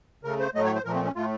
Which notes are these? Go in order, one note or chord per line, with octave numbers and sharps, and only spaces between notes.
C#3 A3 A#4
C5
A2 F#3 A3 D#5
C#5
C5
A#2 F3 A3 A#4
C4
C#4
A2 A3 F4